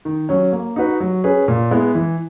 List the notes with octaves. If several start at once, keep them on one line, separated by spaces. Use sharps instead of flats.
D#3
F#3 C#4
A#3
D#4 F#4 B4
F#3
C#4 G#4 B4
A#2
G#3 B3 E4
E3